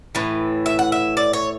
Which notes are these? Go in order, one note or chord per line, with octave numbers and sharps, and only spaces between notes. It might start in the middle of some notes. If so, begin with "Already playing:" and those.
A2 E3
E5
F#5
E5
D5
C#5